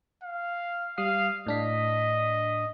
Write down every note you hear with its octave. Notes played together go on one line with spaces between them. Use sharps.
F5
G3 F5 D#6 C7
A2 D4 D#5 B6